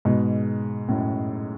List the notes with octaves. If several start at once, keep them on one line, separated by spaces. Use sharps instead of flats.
G#2 B2
F#2 A2